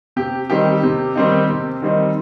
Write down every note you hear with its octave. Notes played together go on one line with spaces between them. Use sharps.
C3 G4
D#3 G3 C4 D#4 G4
C3
D#3 G3 C4 D#4
C3
D#3 G3 C4 D#4